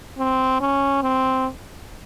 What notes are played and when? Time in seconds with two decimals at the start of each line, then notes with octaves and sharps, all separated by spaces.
0.19 C4
0.61 C#4
1.03 C4